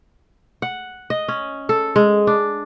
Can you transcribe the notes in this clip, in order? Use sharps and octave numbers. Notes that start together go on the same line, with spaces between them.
F#5
D#5
C#4
A4
G#3
D4